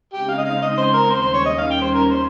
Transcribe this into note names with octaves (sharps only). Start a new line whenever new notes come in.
C#3 G#3 C4 D#4 G4
F5
D#5
F5
D#5
C5
A#4
D#2 D#3 G3 C#4 C5
C5
C#5
D#5
F5
G5
C5
A#4
C5